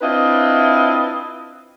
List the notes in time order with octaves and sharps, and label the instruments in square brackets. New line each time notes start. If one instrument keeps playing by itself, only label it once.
[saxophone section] C4 D4 E4 F4 B4 D#5